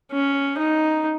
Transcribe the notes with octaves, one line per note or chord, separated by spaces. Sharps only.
C#4
D#4